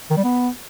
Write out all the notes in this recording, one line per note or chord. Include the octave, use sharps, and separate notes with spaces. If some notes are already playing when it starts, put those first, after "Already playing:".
D#3
G3
B3